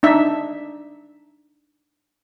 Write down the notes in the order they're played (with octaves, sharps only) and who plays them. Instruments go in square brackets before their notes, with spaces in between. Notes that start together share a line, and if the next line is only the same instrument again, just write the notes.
[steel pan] D4 D#4 E5